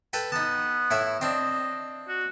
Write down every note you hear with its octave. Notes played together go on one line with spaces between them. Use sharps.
A4 B4 G5
B3 D#4 A5
A2 E4 E5
C4 D4 D#5
F#4